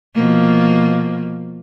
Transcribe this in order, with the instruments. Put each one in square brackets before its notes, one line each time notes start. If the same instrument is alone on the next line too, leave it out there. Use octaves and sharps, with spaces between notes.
[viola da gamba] B2 F3 A#3